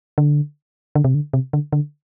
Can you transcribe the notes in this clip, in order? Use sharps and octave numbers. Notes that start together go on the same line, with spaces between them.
D3
D3
C3
D3
C3
D3
D3